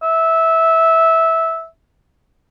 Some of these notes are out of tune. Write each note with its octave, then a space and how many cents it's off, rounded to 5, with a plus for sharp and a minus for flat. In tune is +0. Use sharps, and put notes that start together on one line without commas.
E5 -15